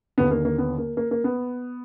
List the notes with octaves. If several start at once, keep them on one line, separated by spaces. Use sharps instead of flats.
D#2 D3 B3
A#3
A#3
B3
A#3
A#3
A#3
B3